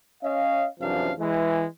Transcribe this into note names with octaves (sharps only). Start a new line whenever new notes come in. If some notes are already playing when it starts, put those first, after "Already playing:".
C#4 C#5 D#5 F5
F#2 C3 E3 F3 D4 F5
E3 G#3